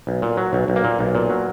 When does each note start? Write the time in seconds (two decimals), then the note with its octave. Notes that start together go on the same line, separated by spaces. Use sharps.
0.07 B1
0.22 A#2
0.37 F#3
0.53 B1
0.68 B1
0.76 A#3
0.84 A#2
0.99 B1
1.15 A#2
1.30 F#3